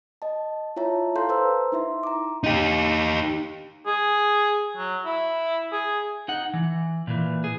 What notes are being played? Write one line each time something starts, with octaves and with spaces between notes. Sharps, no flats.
D#5 A5
E4 F4 C#5 E5 A5 A#5
A4 F5 A5 A#5 C6 G6
B4 C5 A#5 E6
D#4 E4 E5 C6
A#5 D6
D#4 G4
G#4
F#3
E4
G#4
D#4 F#5
E3
A#2 E3
G#4